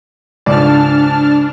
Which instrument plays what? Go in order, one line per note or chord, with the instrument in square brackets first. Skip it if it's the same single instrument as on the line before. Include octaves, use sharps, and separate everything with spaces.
[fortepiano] C#2 G#2 D5 [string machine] D4 [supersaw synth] A5 F6